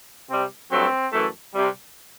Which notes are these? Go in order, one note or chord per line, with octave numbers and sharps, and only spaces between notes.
C3 G3 C4
G2 F#3 A3 C4
F#2 E3 A3
C3 G3